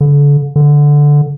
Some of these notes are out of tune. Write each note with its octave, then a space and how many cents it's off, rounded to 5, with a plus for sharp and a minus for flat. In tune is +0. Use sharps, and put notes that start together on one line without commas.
D3 -35
D3 -5